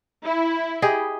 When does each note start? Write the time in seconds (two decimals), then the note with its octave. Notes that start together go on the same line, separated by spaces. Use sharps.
0.24 E4
0.82 G4 G#4 D#5